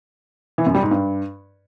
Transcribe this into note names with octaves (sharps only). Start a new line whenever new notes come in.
E3
F#2
G3
G#2
G2